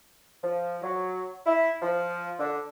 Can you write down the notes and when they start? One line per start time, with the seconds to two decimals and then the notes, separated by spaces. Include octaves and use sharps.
0.43 F3
0.82 F#3
1.46 E4
1.82 F3
2.38 D3